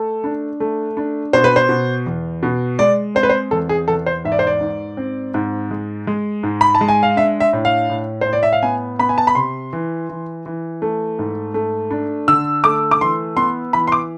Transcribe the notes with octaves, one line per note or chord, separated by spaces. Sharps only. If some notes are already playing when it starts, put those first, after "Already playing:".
Already playing: A3 A4
D4
A3
D4
B2 C5
B4
C5
B2
E2
B2
G#3 D5
C4 C5
B4
C5
E2 A4
G#4
E2 A4
C5
G#2 E5
D5
C5
D5
G#2
C4
G#2
G#3
G#3
G#2
B5
A5
G#3
G#5
F5
D4 E5
E5
A2
F5
A2
A2 C5
D5
E5
F5
B3 G#5
B3 B5
G#5
A5
B5
C3 C6
E3
E3
E3
A3
G#2
A3
D4
D3 E6
A3 D6
D6
E3 C6
B3 C6
E3 B5
C6
D6